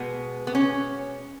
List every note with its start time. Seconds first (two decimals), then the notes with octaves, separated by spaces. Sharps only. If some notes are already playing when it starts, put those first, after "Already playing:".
Already playing: B2 G#3 B3
0.47 B3
0.55 C#4